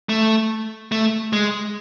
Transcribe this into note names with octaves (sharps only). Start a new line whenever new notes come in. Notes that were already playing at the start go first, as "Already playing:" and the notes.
A3
A3
G#3